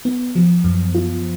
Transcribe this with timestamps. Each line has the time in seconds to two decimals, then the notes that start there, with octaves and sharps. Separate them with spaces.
0.05 B3
0.35 F3
0.64 F#2
0.95 F4